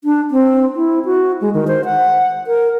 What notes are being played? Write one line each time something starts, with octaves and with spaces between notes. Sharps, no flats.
D4
C4
E4
F#4
G#3
D#3
C5
F#5
A#4